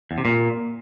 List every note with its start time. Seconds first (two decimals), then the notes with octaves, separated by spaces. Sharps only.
0.11 E2
0.18 C3
0.25 A#2